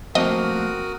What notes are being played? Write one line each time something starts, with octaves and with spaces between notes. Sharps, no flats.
F3 A3 A#3 C4 F#4 A#4 D#5 D#6